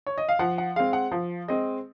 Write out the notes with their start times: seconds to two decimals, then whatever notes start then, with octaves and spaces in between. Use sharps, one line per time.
0.06 C#5
0.18 D#5
0.29 F5
0.39 F3 F#5
0.58 F#5
0.76 G#3 C4 F5
0.93 F#5
1.12 F3
1.48 G#3 C4 D#5